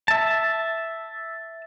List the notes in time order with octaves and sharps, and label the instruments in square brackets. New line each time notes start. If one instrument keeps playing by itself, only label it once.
[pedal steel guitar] E5 A5